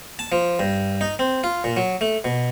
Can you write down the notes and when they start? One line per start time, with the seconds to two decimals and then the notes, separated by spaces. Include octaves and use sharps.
0.19 A5
0.32 F3
0.59 G2
1.01 D#4
1.19 C4
1.44 F4
1.64 A#2
1.77 F#3
2.01 A3
2.24 B2